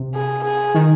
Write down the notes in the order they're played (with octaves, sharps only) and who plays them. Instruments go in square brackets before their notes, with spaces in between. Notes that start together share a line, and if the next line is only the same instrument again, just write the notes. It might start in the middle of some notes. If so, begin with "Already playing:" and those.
Already playing: [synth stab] C3
[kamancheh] G#4
G#4
[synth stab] D#3